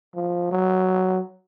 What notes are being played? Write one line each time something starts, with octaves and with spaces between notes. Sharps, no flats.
F3
F#3